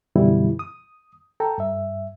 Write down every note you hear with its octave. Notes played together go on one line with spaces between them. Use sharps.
F#2 B2 D3 E3 G3 E4
D#6
A4 G5 A#5
G2 E5